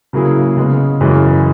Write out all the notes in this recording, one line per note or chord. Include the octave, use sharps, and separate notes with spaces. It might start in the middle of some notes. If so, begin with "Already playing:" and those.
C#3 F#3 A#3 E4 G#4
C#3 G#3 B3
F#2 C#3 E3 G#3